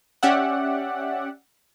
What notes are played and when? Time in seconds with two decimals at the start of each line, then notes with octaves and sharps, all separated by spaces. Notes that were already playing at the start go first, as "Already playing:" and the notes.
0.23 C#4 G4 D5 E5 F#5